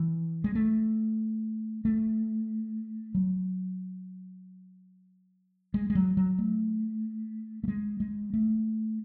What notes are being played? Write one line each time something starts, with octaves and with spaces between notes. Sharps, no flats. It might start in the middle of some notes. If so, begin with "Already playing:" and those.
Already playing: E3
G#3
A3
A3
F#3
G#3
G#3
F#3
F#3
A3
A3
G#3
G#3
A3